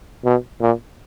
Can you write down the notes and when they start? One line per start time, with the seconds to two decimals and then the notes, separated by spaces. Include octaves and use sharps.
0.25 B2
0.61 A#2